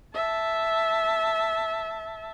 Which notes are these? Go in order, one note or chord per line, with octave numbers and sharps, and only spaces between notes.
E5 A5